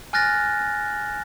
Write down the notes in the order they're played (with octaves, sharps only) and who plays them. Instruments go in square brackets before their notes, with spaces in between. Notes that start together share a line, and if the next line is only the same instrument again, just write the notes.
[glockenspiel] G#5 F6 F#6 A6 A#6